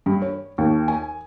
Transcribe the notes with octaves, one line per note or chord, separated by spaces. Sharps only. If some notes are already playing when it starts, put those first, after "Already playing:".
G2
C#5
D#2
G#5